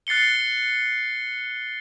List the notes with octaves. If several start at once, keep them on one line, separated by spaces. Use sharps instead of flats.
F#6 A6 C7 C#7 G7